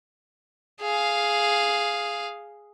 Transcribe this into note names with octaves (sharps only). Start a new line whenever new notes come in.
G#4 F5